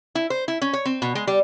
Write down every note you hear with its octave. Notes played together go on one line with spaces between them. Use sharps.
E4
C5
E4
C#4
C#5
C4
B2
G#3
G3